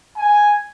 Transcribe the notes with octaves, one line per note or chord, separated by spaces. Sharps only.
G#5